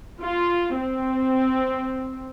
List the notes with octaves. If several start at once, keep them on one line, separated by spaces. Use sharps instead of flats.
F4
C4